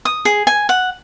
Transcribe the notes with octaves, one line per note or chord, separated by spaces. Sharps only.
D#6
G#4
G#5
F#5